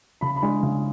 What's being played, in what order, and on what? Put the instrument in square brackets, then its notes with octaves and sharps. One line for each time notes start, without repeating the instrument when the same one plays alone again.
[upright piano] C#3 B5
B5
G#3 D4
C#3